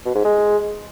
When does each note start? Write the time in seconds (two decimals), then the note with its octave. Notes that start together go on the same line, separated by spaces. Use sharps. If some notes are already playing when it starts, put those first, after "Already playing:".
0.05 B2
0.15 G#2
0.25 G#3